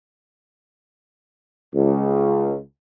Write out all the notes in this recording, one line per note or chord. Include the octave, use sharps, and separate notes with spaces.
C#2